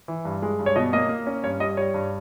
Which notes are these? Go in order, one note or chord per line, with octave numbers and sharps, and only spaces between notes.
E3
G2
G#3
G2
C#5
B2 D#5
A#3 D#5
A#3
C#4
G2 C#5
G3 D#5
G3 C#5
G2